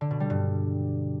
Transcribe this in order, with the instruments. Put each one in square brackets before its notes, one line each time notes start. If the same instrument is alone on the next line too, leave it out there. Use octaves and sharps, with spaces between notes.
[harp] D3
B2
G3
G2